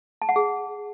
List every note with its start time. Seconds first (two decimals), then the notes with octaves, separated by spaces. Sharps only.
0.22 A5
0.29 F#5
0.36 G#4